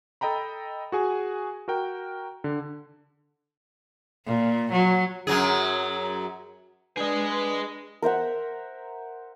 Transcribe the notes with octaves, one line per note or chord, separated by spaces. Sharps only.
A4 D#5 G5 A#5 B5
F#4 G#4 G#5
F#4 A#4 G5
D3
A#2
F#3
F#2 F#3 G#4
D4 G#4 B4 D#5
A#4 C5 E5 F#5